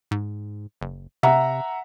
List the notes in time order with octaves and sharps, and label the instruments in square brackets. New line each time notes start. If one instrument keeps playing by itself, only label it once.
[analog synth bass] G#2
F#1
[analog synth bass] C3 [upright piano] E5 F#5 A#5